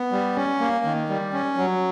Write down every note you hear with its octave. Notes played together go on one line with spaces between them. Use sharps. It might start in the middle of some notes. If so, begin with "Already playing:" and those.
Already playing: B3
G3
C#4
A#3
D#3
G3
C#4
F#3